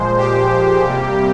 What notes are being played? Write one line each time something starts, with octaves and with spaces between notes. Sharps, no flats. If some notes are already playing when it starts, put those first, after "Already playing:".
Already playing: A#2 F3 G#3 C5
G4
C3 G3 A#3